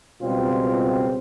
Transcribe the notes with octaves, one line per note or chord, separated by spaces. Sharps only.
C#2 B2 G3 C4 F4